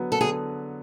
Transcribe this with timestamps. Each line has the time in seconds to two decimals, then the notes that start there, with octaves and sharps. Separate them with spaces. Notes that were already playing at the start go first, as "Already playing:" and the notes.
Already playing: D3 F#3 B3
0.12 A4
0.21 D3 G#4